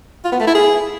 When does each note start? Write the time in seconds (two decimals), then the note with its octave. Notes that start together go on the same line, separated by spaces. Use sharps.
0.25 F4
0.32 B3
0.40 A3
0.47 E4
0.55 G#4